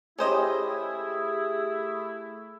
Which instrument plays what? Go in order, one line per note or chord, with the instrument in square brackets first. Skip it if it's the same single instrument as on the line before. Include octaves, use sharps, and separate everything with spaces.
[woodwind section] A3 E4 [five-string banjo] C#4 C5 D#5 [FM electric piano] G4 G#4 [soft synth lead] D#6